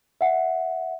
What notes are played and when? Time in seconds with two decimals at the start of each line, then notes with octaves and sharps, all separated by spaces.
0.21 E5 F#5